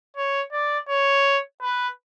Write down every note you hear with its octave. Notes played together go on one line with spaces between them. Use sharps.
C#5
D5
C#5
B4